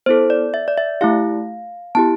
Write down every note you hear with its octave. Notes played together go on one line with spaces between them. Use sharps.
B3 E4 A4 C5
D5
E5
D5
E5
A3 E4 G4 F5
B3 E4 G4 A5